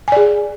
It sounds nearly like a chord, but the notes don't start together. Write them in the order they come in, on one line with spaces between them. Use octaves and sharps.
G#5 D5 G#4